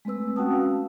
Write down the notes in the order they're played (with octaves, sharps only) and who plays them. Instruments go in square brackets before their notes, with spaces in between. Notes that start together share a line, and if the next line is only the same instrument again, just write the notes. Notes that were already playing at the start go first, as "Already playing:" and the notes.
[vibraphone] G#3 A3 C4 B4 E6
C#4 F#4 F#5 G5 A5 D#6
F5